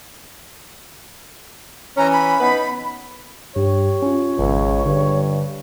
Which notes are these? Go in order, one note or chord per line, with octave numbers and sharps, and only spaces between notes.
E3 C#4 A#5
B5
B3 D#4 B4
G2 G4 C#5
C#4 F4
G#1 C#2
G2 D3